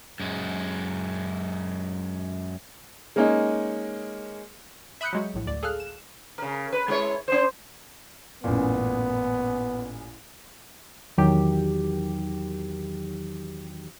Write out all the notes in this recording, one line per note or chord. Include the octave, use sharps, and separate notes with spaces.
F#2 G#3
G#3 A#3 C#4 D#4
E5 B5 D#6 F#6 G6 C#7
F#3 G#3 F#4
A#1 A2
D2 D5
G#4 A4 F5 F6 F#6
E7
C#3 A#4
B4
G#3 E4 C#5
C#4 C5
A1 F#2 A#2 B3
E2 D#3 F#3 G4